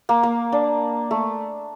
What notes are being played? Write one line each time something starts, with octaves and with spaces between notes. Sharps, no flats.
A#3
A#3
D4
A3